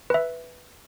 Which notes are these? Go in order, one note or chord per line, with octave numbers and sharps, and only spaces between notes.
B4 E5